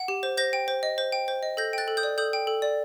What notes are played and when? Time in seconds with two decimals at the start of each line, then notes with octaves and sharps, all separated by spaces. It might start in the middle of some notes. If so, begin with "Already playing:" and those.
Already playing: F#5
0.08 G4
0.23 C5
0.37 C5 G6 A#6
0.53 G5
0.68 C5
0.83 D#5
0.98 C5
1.12 G5
1.28 C5
1.43 D#5
1.57 A4 G6 A#6
1.73 G5 F#6 A6
1.88 A4
1.97 D#6 G6
2.03 D5
2.18 A4 D#6 G6
2.33 G5
2.47 A4
2.62 D5